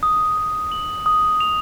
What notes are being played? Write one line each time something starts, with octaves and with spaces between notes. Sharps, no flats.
D#6
D#6
F#7
D#6
F7